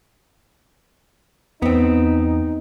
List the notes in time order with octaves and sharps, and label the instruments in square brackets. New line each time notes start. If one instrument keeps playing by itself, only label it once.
[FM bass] E2 [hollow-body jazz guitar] B3 C4 [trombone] D#4